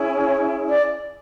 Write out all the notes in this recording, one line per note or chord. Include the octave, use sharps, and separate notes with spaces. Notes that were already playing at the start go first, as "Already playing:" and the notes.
Already playing: C#4 E4 G#4
C#5
D5